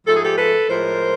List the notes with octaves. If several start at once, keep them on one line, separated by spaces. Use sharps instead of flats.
G#2 F3 A3 A4
G#4
G4 A4
A4 B4
A2 F3 G#3 A#4 C5